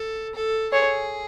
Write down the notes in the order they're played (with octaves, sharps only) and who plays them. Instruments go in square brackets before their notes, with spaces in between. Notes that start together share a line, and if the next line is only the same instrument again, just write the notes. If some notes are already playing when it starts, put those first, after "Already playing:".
Already playing: [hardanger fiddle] A4
A4
[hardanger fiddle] G#4 [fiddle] C#5